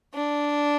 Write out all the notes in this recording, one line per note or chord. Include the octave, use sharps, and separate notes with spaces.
D4